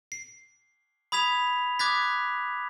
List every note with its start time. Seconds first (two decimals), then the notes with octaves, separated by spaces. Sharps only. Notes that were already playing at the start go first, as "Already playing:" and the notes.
0.12 C7
1.12 B5 D#6 G#6 B6 F7
1.79 D6 D#6 F#6 G#6 A6 B6